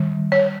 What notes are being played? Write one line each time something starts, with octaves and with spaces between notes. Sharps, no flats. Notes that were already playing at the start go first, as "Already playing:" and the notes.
Already playing: D#3 G3
C#5